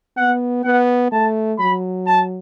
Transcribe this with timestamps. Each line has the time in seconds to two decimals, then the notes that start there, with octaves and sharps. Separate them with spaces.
0.17 B3 F#5
0.64 B3 F#5
1.12 A3 A5
1.59 F#3 B5
2.06 A5